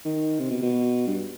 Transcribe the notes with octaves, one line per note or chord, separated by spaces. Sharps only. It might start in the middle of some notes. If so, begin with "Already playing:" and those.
D#3
C3
B2
B2
G2